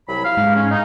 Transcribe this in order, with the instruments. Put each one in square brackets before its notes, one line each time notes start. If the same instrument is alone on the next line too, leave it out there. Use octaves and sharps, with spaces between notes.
[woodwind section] C2 F#3 B5
F5
[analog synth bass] G#2
[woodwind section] C#4
D#4